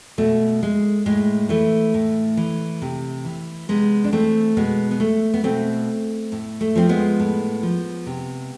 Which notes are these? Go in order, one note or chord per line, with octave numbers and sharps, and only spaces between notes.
B2 A3
G#3
A2 G#3
E3 A3
A2
E3
C3
E3
C3 G#3 B3
D4
E3 A3 C4
B2 G#3 B3
B3
A3
B3
B2 A3 C4
A2
A3
F3 C4
G#3 B3
A2
F3
C3